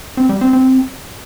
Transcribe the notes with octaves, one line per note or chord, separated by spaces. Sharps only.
C4
G3
C4
C4